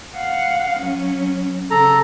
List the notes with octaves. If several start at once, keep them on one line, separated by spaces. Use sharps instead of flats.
F5 F#5
F#3 C#4
C#3 A4 A#5